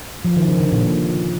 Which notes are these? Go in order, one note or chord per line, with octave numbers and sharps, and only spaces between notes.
F3
D#3
C#3
D3
A#2